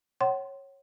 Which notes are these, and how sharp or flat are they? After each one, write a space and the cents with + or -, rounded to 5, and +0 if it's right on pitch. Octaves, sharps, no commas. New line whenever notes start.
C#5 -15 F#5 +40 C6 +0